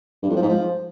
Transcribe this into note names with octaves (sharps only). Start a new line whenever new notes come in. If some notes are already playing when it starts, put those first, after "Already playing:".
G2
F2
F3
G#2
F3